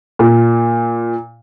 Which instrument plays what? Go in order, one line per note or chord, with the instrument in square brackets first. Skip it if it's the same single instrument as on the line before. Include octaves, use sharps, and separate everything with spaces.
[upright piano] A#2